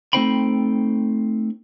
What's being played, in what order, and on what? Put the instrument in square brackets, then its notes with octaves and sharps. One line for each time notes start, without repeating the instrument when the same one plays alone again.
[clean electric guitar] A3 C4 D#4 C5 G5 B5